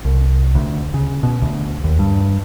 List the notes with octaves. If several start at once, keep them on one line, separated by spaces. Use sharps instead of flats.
C2
D2
C#3
B2
D2
D#2
G2